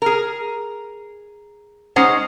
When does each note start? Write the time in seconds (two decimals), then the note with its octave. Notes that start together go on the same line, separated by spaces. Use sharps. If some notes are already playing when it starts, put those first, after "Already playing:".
0.02 G#4 A#4
1.96 G#3 C#4 D#4 C5 F#5